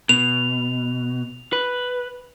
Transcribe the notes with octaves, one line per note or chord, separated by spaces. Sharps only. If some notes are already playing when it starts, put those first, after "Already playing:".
B2 F7
B4